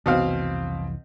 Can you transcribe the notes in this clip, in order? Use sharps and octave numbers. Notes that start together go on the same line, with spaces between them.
F1 C2 B2 E3 C4 F5